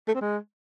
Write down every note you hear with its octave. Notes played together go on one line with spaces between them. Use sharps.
A3
C4
G#3